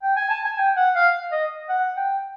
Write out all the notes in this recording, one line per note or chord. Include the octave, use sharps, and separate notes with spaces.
G5
G#5
A5
G#5
G5
F#5
F5
D#5
F#5
G5